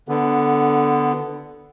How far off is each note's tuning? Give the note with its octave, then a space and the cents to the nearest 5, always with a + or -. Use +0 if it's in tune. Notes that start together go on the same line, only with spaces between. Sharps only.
D3 +0 B3 +0